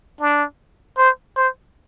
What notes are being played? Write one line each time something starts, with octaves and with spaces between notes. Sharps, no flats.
D4
C5
C5